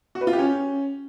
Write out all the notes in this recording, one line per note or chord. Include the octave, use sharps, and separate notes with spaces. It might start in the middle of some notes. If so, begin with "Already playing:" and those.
F#4
B4
F4
G4
C#4